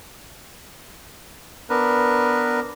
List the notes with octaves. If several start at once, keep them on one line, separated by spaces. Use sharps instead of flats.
B3 D4 A#4 B4